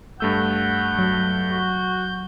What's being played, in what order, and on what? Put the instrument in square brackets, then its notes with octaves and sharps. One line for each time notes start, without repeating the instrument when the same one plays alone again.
[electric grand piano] G2 A3 E6 [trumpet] F#5 [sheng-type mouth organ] G6
[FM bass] F#3
[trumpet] F#4